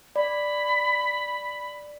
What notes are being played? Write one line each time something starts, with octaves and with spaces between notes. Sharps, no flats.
D5 B5